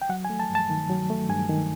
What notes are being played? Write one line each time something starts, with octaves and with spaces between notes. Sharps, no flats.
G5
F#3 F#5
G#5
A3
A5
G2
A5
D#3
F#3
A3
G2 G#5
D#3